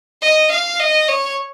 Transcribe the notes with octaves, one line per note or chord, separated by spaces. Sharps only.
D#5
F5
D#5
C#5